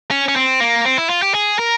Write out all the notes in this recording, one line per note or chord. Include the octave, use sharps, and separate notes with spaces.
C#4
C#4
C4
A#3
C4
E4
F4
G4
G#4
A#4